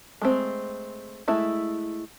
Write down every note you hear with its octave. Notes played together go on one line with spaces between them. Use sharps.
G#3 A3 C4
G#3 A3 E4